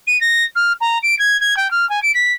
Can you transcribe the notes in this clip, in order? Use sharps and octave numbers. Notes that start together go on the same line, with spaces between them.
D#7
A#6
F6
A#5
D7
G#6
G#6
G5
F6
G#5
D7
B6